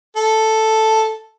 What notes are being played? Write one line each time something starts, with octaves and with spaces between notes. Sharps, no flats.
A4